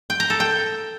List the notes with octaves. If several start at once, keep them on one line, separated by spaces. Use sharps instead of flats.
G5
A#5
A4
G5